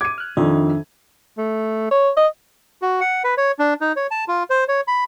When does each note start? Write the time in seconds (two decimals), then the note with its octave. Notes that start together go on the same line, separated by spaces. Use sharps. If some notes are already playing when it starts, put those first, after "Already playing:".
0.01 D6 G#6 D#7
0.18 F6 F#6
0.37 F2 D#3 D4 E5
1.38 A3
1.91 C#5
2.17 D#5
2.82 F#4
3.01 F#5
3.24 B4
3.37 C#5
3.59 D4
3.81 D#4
3.96 C#5
4.11 A5
4.28 F4
4.50 C5
4.68 C#5
4.88 B5